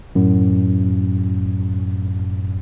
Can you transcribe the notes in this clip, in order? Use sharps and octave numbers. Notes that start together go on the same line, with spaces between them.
F#2 A2